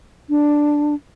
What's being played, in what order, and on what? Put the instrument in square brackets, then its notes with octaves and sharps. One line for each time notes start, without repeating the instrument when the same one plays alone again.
[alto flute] D4